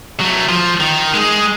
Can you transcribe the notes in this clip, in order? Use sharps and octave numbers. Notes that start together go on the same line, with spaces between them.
F#3 A3
F3
D#3
G#3 G#4